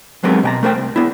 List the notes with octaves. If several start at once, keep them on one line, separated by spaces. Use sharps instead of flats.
F#3 G#3 B3 C4 G4 A#4
B2 G5 A#5
A3 A#4 C5 G5
C2
B3 E4